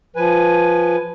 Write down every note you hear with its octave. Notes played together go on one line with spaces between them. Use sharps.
F3 B4 G#5